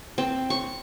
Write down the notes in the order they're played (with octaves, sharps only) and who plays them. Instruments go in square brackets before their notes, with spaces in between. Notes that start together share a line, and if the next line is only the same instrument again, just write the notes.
[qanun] C4
C#6